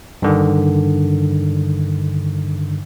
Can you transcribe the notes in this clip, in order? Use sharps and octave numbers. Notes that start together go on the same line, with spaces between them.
G2 D3 D#3